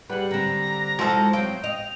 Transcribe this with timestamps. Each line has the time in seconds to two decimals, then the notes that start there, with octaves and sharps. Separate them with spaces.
0.10 G3 G#4 B4 F#5
0.31 D3 C4 A#5
0.99 F3 G#3 E4 F#4 A4 C5
1.33 F#3 C4 F5 G5
1.64 D#5 F7